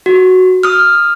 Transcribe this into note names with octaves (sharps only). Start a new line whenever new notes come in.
F#4
D#6 F6